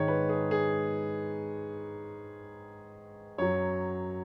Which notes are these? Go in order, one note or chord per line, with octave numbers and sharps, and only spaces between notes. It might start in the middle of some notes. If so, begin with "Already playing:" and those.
Already playing: G#2 D#3 G#3 C#5
B4
G#4
G#4
F#2 F#3 C#5